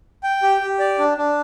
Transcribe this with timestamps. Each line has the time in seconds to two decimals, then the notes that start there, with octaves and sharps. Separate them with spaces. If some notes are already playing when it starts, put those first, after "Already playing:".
0.23 G5
0.43 G4
0.61 G4
0.79 D5
0.99 D4
1.18 D4